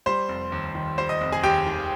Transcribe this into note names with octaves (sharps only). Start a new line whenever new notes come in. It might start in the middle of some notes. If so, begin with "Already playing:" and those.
G3 C5 C6
F1
D#2
D#3
G3 C5 C6
D#5 D#6
F1
G#4 G#5
D#2 G4 G5
D#3